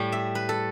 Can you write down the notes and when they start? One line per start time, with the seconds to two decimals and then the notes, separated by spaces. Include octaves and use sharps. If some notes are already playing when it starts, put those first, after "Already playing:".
Already playing: A2 G3 G5
0.12 E5
0.35 B4
0.49 A4